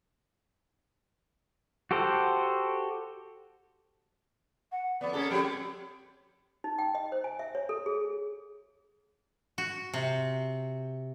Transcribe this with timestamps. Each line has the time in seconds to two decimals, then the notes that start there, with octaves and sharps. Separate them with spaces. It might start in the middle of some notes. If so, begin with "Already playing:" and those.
1.91 F#4 G4 A4 C5
4.72 F#5
5.01 F2 B3 D5
5.13 A#3 C#4 G#4 A4
5.30 F3 G3 C4 G4
6.64 D#4
6.79 G5
6.95 D#5
7.12 C5
7.24 G#5
7.39 E5
7.55 C#5
7.69 A4
7.86 G#4
9.58 F#4
9.93 C3